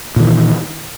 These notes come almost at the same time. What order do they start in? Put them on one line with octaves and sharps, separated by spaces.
A#2 D#3 E3